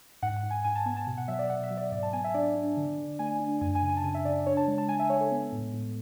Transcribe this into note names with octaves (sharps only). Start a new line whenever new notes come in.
G#2 F#5
F#5
G#2
G#5
G#2 G#5
A5
B3 G#5
A5
B2
F#5
F#3 E5
D5
B2 F#5
E5
F#3
D5
G#2 D5
A5
B3 G#5
E5
D4 D5
D4
D3
D3
A3 G#5
D4
F#2 G#5
G#5
C#3
G#5
A5
C#3 G#5
E5
C#3 D5
D4 C#5
A5
G#3
A5
G#3 G#5
E5
G#3 C#5
A4
B3
A2
A2